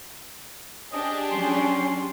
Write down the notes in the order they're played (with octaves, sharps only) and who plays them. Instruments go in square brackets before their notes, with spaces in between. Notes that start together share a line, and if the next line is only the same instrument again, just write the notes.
[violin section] D4 G4 G#4 [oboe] D#5
[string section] F#3 C#4 [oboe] C6